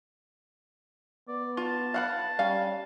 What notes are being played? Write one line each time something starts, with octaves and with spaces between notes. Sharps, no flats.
B3 D5
F4 A5
F5 F#5 B5
G3 C#4 F5